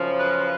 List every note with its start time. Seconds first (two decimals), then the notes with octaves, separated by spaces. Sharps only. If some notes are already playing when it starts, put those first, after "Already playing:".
Already playing: F#2 C#3 F3
0.18 B4